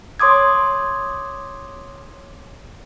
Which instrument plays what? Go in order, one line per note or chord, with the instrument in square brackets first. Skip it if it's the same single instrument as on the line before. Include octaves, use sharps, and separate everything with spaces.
[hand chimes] C#5 C6 D6 D#6 G#6